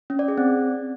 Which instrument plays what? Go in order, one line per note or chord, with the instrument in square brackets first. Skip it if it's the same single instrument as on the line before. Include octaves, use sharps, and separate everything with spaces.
[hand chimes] C#4
D5
G#4
C4